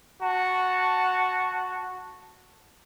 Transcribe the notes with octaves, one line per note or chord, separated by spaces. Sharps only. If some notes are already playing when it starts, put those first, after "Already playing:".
F#4 A5